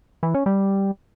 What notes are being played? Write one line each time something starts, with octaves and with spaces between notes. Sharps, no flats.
E3
C#4
G3